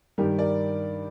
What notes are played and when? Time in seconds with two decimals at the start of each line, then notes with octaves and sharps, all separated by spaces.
0.18 G2 D#3 G3 G4 A#4
0.39 A#4 D5